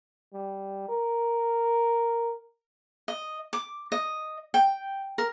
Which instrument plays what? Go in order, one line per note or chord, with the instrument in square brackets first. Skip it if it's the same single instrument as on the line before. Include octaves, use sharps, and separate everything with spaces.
[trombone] G3
A#4
[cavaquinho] D#5
D6
D#5
G5
A#4